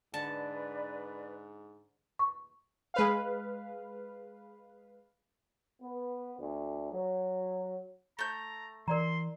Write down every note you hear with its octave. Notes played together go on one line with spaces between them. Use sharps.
G#2 D3 B4 D5 A5
C#6
G#3 B4 F5
B3
D2
F#3
A3 A#5 G6
E3 A#4 D5 A#5 C6